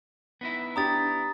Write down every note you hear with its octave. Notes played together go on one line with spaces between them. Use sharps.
B3 D#4 E4
D4 G4 A#5 D#6 A6